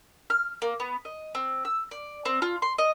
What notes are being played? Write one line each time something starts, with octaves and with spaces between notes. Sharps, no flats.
F6
A#3
B3
D#5
C4
E6
D5
C4
F4
C6
D#5